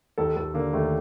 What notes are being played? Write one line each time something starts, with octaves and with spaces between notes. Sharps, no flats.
D#2 A4
D#2 A4
D3 A#3
D#2 A3